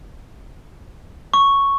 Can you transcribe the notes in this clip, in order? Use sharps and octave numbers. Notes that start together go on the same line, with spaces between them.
C#6